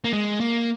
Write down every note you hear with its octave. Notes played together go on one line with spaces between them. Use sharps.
A#3
G#3
A#3